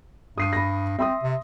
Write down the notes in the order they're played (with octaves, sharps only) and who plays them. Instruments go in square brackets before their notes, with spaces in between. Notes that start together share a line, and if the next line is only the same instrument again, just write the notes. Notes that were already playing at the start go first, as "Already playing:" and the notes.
[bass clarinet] G2 [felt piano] D#6 C7 D#7
[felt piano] B5 A#6
[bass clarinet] C4 [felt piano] E5 C6 D#6
[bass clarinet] C3